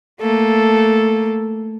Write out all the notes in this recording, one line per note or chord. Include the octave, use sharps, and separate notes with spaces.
A3 A#3 A4